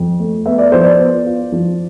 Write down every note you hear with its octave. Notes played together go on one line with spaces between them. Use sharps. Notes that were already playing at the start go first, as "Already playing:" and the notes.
Already playing: F2
A3
B3 E5
D5
F3 C5
D5
B3
F4
F3